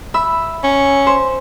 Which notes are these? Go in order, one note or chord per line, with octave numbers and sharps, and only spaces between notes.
E5 B5 E6
C#4
C5